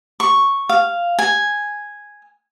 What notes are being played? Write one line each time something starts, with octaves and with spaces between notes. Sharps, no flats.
C#6
F5
G#5